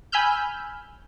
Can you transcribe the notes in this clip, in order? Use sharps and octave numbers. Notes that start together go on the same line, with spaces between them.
G#5 B5 E6 F6 G6